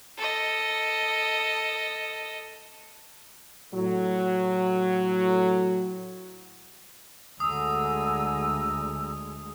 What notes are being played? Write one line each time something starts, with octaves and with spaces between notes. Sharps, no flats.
A4 D#5
A2 F#3
D2 D3 G#3 G#5 A#5 D#6 E6